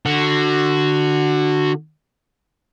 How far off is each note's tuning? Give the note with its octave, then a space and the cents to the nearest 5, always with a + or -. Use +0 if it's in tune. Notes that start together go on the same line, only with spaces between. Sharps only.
D3 +15 F#4 +0